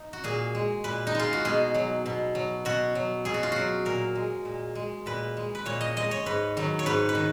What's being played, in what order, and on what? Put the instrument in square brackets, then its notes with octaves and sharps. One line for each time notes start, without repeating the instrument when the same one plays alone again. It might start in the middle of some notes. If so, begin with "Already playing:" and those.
Already playing: [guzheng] D#4
F#4
A#2 G#4
G#3
A#2 B4
D#4
G#3 F4
F#4
B2 G#4
F#3
B2
F#3
B2 F#4
F#3
B2 G#4
F#4
F4
F#3 F#4
A#2 A#4
G#3
A#2
G#3
A#2 B4
G#3
B4
A#2 C#5
D#5
G#3 D#5
C#5
G#2 B4
D#3 F#3
C#5
G#2 B4
B4
D#3